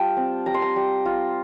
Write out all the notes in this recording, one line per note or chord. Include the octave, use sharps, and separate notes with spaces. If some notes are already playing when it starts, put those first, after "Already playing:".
Already playing: G3 F4 G5 A5
C4
G3 A#5
C6
A#5
G3
F4